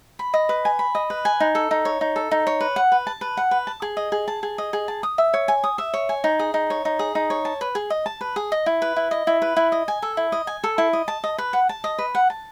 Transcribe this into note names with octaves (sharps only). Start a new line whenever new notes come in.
B5
D#5
B4
G#5
B5
D#5
B4
G#5
D#4
A4
D#4
C#5
D#4
A4
D#4
C#5
B4
F#5
B4
A5
B4
F#5
B4
A5
G#4
D#5
G#4
A5
G#4
D#5
G#4
A5
D#6
E5
C#5
G#5
D#6
E5
C#5
G#5
D#4
G#4
D#4
C#5
D#4
G#4
D#4
C#5
A5
B4
G#4
D#5
A5
B4
G#4
D#5
E4
B4
E4
D#5
E4
B4
E4
D#5
G#5
A4
E4
D#5
G#5
A4
E4
D#5
A5
D#5
B4
F#5
A5
D#5
B4
F#5
A5